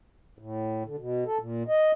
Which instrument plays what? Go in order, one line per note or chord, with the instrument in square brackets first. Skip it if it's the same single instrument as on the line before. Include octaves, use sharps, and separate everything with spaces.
[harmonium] A2
D3
B2
A4
A#2
D#5